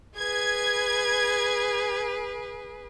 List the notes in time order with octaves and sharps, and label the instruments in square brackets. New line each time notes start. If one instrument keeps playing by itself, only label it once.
[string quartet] G#4 B4 [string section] G#6